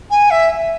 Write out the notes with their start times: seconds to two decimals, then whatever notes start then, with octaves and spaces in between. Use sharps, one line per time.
0.10 G#5
0.30 E5